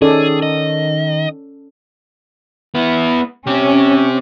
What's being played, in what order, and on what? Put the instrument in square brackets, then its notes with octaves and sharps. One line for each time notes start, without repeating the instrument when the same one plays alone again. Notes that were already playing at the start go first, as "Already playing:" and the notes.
[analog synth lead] D#3 [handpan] C#4 A4 D5 [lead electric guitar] G#4
[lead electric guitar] D#5
[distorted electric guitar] B3 E4
[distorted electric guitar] C4 G4 [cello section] C#4